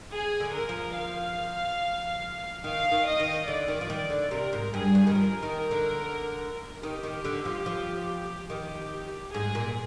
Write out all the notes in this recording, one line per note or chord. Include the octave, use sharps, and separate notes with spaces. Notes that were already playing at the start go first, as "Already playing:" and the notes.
G#4
D3
A#4
F3
F5
D#3 F5
D#3
D#5
D#3
D3 D5
D#3
F3
D#3
D3
C3 A#4
G#2
G2 G#4
G2
D#3
F3 A#4
D#3
D3
D#3 G4
D#3
D3
F3
F3
D#3 G4
G#2 G#4
A#2